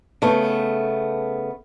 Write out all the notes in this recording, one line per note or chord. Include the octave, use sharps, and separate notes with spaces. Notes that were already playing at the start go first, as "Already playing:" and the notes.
C#3 A3 B3